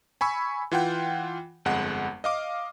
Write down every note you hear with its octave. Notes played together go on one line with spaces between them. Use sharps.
G#5 B5 C#6 E6
E3 F4 F#5 G5
G1 F2 G#3 F#5
D#5 F5 D6